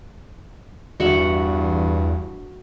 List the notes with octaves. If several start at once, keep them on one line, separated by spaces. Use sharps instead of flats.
E2 G2 F#4 E5 F#5